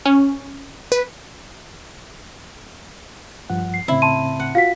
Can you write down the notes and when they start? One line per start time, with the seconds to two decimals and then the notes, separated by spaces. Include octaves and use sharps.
0.05 C#4
0.92 B4
3.50 G2 F3 F#5
3.74 C7
3.88 A2 C#3 C4 E4
4.02 A5 C6 D#7
4.40 F#5
4.55 F4 F#4 F5 B6